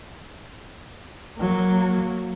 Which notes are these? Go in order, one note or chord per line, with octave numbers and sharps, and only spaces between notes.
F#3 A#3